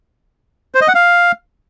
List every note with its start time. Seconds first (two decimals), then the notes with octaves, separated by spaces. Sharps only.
0.75 C5
0.81 D#5
0.88 F#5
0.95 F5